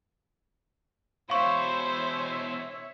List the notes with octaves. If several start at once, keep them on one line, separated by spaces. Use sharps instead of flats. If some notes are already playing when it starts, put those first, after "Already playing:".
B2 E4 C5 C#5 E5 F5 C#6